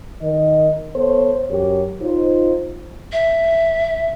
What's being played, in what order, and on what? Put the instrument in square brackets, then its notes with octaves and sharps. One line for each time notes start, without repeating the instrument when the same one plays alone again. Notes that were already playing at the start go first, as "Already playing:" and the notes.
[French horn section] D#3 A#4 D#5
B3 A4 C5 C#5
F#2 F#3 G4 A#4 C#5
D#4 F4 C5
[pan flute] E5